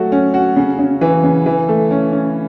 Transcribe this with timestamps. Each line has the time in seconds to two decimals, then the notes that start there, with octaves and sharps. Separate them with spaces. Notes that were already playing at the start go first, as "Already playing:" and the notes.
Already playing: F#3 A3 F#4
0.12 C#4
0.34 F#4
0.56 C#3
0.79 C#3
1.01 E3
1.24 C#3
1.46 E3
1.68 A3
1.91 C#4
2.12 C#4